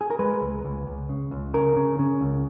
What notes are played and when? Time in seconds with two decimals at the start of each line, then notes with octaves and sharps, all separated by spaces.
0.01 G#4
0.10 A#4
0.19 G#3 B4
0.41 C#2
0.65 C#2
0.87 C#2
1.09 C#3
1.31 C#2
1.54 C#3 A#4
1.76 C#3
1.99 C#3
2.21 C#2